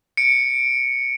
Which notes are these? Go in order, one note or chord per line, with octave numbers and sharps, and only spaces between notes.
C#7 D7